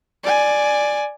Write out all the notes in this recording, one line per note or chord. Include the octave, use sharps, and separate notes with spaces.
D5 G#5